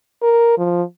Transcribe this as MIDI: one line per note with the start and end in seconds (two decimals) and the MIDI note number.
0.22 0.58 70
0.58 0.83 53